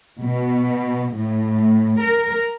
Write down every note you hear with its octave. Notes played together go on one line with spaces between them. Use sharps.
B2
A2
A#4